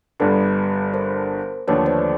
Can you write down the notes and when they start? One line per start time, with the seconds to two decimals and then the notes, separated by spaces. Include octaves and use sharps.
0.20 G1 G2 D3 A4 B4
0.94 A#4 C5
1.67 D#2 D3 F3 A3 B4 C#5
1.86 C5 D5